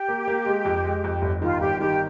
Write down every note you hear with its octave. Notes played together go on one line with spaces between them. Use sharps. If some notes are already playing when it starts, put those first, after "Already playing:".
Already playing: G4
A#3
A#3
G#3
F2
G#3
F2
G1
D#3 F4
G1 G4
D#3 G4